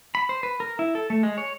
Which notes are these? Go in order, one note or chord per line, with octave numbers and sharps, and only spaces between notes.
B5
C5
B4
A#4
E4
A4
A3
G#3
C#5